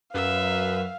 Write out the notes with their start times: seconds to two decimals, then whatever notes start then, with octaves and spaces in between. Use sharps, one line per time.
0.14 F#2 B4 E5 F5